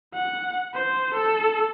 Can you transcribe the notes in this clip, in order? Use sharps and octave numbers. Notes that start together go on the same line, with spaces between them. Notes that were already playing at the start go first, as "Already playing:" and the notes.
F#5
C5
A4